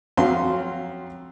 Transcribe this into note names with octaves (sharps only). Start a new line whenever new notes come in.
F2 F#3 C#4 F5 C6